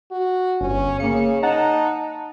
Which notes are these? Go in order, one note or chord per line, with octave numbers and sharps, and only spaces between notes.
F#4
G1 C#4
C#3 A#3 C#7
D#4 F#5 A5 A#5